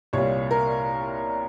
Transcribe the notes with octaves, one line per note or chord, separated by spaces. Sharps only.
C2 A#2 G3 C#5
A#4